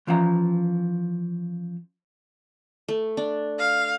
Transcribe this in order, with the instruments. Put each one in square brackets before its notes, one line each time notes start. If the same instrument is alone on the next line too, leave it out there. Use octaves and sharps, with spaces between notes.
[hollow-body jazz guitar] E3 F3 C#4 F5 A#5
[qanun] A3
D4
[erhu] F5